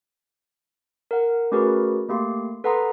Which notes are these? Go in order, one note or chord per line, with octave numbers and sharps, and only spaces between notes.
A#4 F#5
A3 C#4 F#4 G#4 A#4 B4
A3 A#3 G4 C6
A4 B4 F#5 A#5 C6 D#6